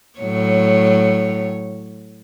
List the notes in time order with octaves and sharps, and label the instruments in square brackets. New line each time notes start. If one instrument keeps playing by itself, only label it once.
[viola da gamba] A2 F#3 C#5